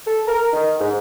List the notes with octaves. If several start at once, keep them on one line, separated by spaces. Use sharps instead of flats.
A4
A#4
D#3
G#2